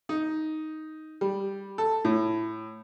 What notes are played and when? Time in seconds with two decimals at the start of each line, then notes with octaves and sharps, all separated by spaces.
0.09 D#4
1.21 G3
1.78 A4
2.05 A2